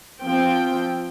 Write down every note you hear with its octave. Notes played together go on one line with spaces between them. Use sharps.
F3 C4 G5